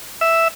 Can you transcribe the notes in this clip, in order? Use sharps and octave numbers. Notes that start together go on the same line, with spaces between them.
E5